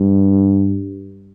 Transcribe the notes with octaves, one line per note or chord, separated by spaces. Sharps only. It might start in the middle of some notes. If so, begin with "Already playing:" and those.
Already playing: G2